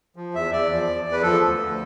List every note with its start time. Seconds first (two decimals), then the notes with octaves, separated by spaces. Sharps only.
0.16 F3
0.34 E2 E5
0.52 E2 D5
0.70 F3
0.87 E2
1.05 E2
1.12 B4
1.23 F3 A4
1.41 D2
1.58 D2